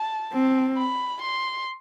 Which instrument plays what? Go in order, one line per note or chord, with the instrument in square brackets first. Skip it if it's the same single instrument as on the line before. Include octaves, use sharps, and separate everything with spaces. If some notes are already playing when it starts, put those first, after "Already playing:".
Already playing: [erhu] A5
[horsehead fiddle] C4
[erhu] B5
C6